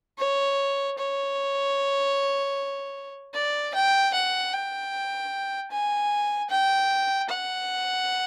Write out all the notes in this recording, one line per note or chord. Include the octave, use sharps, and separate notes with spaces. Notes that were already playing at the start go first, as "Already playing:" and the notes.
C#5
C#5
D5
G5
F#5
G5
G#5
G5
F#5